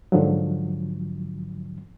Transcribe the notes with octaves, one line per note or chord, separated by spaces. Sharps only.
G#2 D3 F3 F#3